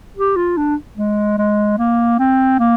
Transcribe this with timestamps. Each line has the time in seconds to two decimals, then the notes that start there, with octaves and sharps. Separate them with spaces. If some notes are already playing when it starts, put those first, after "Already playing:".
0.17 G4
0.36 F4
0.57 D4
0.97 G#3
1.38 G#3
1.78 A#3
2.19 C4
2.59 A#3